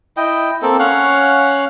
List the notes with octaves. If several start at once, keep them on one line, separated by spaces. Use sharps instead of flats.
E4 D#5 G5
A#3 C4 A4
C#4 C#5 F5 F#5